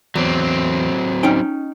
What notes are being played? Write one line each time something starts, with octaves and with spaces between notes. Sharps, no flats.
E2 F#3 C4
C#4 D#4 G5